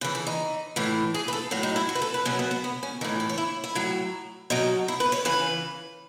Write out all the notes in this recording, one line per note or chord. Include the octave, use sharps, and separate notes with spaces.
C#3 E3 B4
A4
D#4
A2 E3
G#4
B4
A4
A2 F#3 F#4
D#4
E4
F#4
B4
A4
B4
B2 F#3 C#4
B3
B3
B3
C#4
A2 E3 D#4
A4
C#5
E4
E4
A2 F#3
B2 F#3 D#4
E4
B4
C#5
C#3 E3 B4